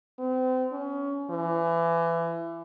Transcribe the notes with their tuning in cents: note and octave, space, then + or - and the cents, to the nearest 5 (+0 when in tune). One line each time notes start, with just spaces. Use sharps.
C4 -35
C#4 +25
E3 +25